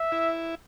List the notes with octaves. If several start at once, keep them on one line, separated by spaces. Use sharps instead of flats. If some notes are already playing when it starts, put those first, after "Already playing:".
Already playing: E5
E4